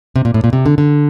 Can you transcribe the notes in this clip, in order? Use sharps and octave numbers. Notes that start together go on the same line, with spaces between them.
C3
A#2
A2
A#2
C3
D3
D3